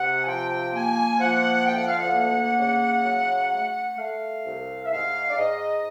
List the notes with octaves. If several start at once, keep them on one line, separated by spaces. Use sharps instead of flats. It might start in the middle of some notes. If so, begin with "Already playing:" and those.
Already playing: C3 F#5
G#5
F3 G5
A#3 G#5
F3 F#5
D2 G5
F#5
F5
F#5
A#3
C#3
F#3
A3
A3 F5
C2
E5
G#2 F5
D5
G#2 D#5